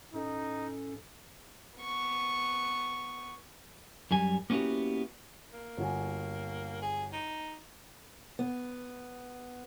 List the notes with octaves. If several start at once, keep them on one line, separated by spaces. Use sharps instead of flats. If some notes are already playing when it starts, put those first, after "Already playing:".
A2 C#4 D#4 A4
B3 C#6
F#2 G3 G#5
A#3 B3 C#4 E4 F#4 G4
A#3
G1 F#4 G#5
G#4
D#4
B3